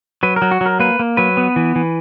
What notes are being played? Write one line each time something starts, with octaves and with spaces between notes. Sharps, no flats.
F#3 B4
A#4
F#3
F#4
F#3 A#4
A#3 B4
A#3
F#3 B4
B3
E3
E3